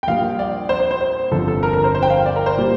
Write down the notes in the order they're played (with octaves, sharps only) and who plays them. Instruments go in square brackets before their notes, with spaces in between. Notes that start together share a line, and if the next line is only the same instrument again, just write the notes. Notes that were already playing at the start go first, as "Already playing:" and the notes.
[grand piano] G5
A#1 A#2 G3 F5
D5
C5
C5
C5
C5
G1 F2 D3 F3 A4
A4
A#4
A#4
C5
C5
G5
F5
D5
A#4
C5
A#2 G3